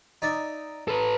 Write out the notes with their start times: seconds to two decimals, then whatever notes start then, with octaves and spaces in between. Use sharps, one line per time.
0.22 D#4 D5 E5
0.88 A4 B4